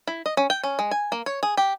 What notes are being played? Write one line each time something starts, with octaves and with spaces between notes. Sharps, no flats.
E4
D#5
C#4
G5
C#4
G#3
G#5
A#3
C#5
G#4
G4